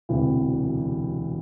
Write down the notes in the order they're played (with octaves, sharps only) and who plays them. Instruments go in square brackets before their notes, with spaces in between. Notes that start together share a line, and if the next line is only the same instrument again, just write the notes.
[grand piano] E1 D2 C3 E3